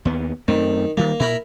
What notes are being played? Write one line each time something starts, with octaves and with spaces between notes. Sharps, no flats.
D#2 B3
F#2 D#3 A3 C4
D#3 G3 A#3
A#2 E4 A#4 B5